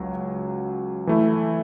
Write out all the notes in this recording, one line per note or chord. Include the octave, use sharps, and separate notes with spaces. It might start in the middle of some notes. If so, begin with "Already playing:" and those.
Already playing: C#2 C#3 F#3
E3 A3 E4